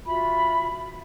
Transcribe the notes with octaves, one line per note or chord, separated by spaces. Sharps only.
F4 F#4 E5 B5